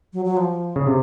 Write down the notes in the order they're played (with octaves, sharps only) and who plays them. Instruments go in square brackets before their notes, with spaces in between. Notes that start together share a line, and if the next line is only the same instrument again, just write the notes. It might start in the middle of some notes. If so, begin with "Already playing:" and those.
[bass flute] F#3
F#3
F3
[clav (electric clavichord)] C#3
C3